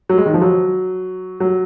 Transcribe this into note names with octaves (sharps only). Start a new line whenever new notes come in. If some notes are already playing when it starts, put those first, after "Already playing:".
F#3
G#3
D#3
F3
F#3
F#3